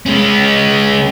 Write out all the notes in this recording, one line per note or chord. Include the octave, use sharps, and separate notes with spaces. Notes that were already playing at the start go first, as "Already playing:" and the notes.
G#3 C#4